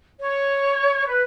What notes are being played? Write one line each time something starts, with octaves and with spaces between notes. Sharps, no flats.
C#5
B4